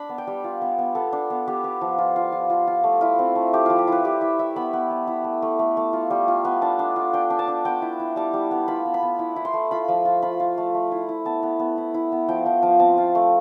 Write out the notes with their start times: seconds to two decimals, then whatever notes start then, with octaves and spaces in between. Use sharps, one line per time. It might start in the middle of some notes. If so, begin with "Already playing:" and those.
Already playing: D4 B5
0.09 B3
0.18 G5
0.27 G3
0.44 F4
0.62 B3
0.79 B3
0.95 B3 A4
1.13 D4
1.30 B3
1.48 B3 G4
1.64 B3
1.81 F3
1.98 F4
2.16 F4
2.32 F4
2.50 F4
2.67 F4
2.84 A3
3.01 E4 F4
3.19 C4
3.36 A3
3.53 A3 G4
3.66 F3 F4
3.79 G4
3.87 E4 B4
4.04 G3 G4
4.21 E4 E5
4.39 E4 E5
4.56 B3 B5
4.73 B3
4.90 B3
5.07 E4
5.24 A3
5.42 A3
5.59 A3
5.77 A3
5.93 F4
6.10 G3
6.28 F4
6.45 B3
6.62 D4 A5
6.79 D4
6.96 F4
7.13 D4 G5
7.30 D4
7.39 A5
7.48 D4
7.65 B3 G5
7.82 E4
7.99 E4
8.16 G3 A5
8.33 G3
8.51 B3
8.68 F4 B5
8.85 B3
8.94 B5
9.03 B3
9.19 E4
9.36 E4
9.45 C6
9.54 A3
9.71 F4 B5
9.88 F3
10.05 F4
10.22 F4 B5
10.40 F4
10.58 A3
10.75 A3
10.92 E4
11.09 E4
11.25 B3 A5
11.43 B3
11.59 B3
11.78 E4
11.94 E4
12.12 B3
12.28 F3 G5
12.46 F3
12.62 F3
12.80 C4 A5
12.98 F4
13.15 A3